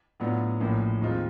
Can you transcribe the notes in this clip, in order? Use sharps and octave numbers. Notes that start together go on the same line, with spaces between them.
A2 F#3 B3 D4 F4
A#1 A2 F3 A#3 C#4
D#2 D#3 G#3 C4 F4